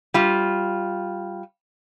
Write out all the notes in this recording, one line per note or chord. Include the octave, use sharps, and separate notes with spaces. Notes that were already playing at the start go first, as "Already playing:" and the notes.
G3 F4